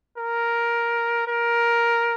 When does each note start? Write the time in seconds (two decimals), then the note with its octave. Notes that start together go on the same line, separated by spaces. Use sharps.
0.17 A#4
1.27 A#4